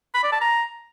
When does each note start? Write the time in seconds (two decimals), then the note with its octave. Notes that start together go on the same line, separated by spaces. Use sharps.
0.14 B5
0.23 D5
0.32 A5
0.41 A#5